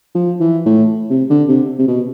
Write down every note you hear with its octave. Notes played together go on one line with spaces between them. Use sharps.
F3
E3
A2
C3
D3
C3
C3
B2